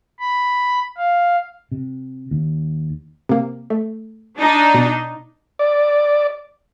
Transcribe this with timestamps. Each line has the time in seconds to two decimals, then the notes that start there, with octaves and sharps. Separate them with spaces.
0.19 B5
0.97 F5
1.72 C3
2.31 D#2
3.29 C3 A#3
3.70 A3
4.37 D4 D#4
4.74 B2
5.59 D5